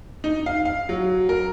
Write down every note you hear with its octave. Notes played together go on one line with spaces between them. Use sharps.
D#4
F5
F5
F#3
A#4